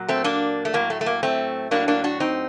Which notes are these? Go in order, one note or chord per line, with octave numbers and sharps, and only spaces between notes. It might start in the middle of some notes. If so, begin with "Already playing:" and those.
Already playing: A#2 F#3
A3 C4
A#3 D4
A3
A2 F#3 A#3
A3
A3
A#3
A3 C4
A2 F#3 A#3 D4
A#3 D4
D4 F#4
C4 D#4